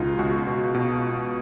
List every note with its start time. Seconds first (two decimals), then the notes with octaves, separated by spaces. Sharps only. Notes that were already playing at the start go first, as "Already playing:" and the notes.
Already playing: C#2 B2 D#4 F4
0.19 C#2 F#4
0.47 B2
0.74 B2